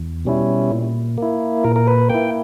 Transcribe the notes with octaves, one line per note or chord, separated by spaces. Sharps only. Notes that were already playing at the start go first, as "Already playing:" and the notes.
Already playing: E2
B2 G3 C#4 E4
A#2
A#3 E4
A#2 A#4
A#4
B4
A#3 E4 G5